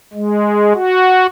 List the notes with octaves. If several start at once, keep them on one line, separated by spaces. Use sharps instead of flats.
G#3
F#4